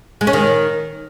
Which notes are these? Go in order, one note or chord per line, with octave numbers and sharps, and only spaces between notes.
G#3
C#4
D#3